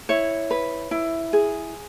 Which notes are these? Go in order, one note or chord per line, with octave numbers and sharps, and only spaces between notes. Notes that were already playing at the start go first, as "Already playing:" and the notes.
E4 C#5
B4
E4
G#4